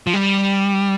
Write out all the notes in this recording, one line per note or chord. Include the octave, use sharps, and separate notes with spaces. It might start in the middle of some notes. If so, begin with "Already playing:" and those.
F3
G3